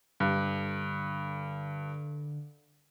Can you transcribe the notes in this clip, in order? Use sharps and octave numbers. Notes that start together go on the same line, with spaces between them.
G2 D3